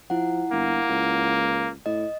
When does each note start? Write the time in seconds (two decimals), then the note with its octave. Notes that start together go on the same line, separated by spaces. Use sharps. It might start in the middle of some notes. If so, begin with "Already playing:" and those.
0.10 F3 E4 F#5
0.52 G1 A#3
0.90 C#2
1.86 A2 D#5